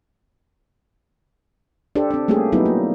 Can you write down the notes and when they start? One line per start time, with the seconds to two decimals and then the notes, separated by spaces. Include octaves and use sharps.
1.95 D4 G4 A4 C5
2.10 C4 D4
2.28 G3 A3 A#3 C#4 G4 G#4
2.52 F#3 G3 B3 D#4 E4
2.66 A#3